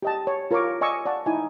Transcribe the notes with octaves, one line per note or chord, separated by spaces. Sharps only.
G4 D#5 A5
C#5
F4 A#4 C#5 F5 C#6 D6
D5 D#5 G#5 C#6 D6 E6
D5 F5 F#5 A5 C#6
D#4 E4 G#5